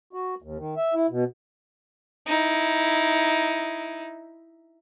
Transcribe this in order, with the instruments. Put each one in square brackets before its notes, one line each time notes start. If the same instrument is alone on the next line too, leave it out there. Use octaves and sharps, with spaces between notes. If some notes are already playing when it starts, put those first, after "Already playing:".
[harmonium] F#4
D#2
D#3
E5
E4
B2
[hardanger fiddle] D#4 E4